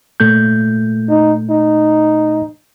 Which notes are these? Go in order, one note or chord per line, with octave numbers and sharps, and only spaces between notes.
A#2 A3 G6
D#4
D#4